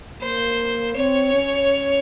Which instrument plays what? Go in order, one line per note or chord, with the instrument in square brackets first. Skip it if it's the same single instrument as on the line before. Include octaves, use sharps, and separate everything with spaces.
[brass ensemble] A#3 [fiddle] C5
[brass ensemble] C4 [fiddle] C#5
[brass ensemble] C#4